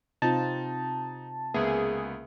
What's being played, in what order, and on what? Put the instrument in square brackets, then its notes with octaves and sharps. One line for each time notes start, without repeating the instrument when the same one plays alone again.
[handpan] C3 C4 F4 [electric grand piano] D#4 [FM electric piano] A5
[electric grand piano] C#2 B3 [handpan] A#3 E5 [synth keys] G#4